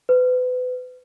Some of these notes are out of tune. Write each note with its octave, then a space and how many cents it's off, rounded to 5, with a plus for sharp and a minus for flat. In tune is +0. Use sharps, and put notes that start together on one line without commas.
B4 +30